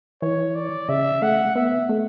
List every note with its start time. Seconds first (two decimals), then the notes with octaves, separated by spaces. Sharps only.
0.22 E3 C#5
0.55 D5
0.89 C#3 E5
1.22 A3 F#5
1.55 B3 E5
1.89 A3